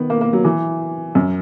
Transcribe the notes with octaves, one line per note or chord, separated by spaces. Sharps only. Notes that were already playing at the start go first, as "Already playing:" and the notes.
Already playing: D#3 B3
A#3
A#3
F#3
E3
F#2